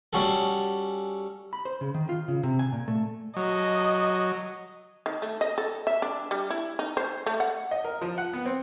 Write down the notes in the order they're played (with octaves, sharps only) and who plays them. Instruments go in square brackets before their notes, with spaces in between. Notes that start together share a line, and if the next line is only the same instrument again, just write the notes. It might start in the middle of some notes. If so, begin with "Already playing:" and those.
[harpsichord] G3 C#4 F#4 G#4 A4
[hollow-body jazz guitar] B5
C5
C#3
D#3
F4
C#3
C3
G#5
A#2
A3
[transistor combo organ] F#3 [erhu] D#5
[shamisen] D#3
A3
D#5
A4
E5
D4
G3
E4
D#4
C5
A3
F#5
[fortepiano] D#5
A#4
F3
F#5
B3
C4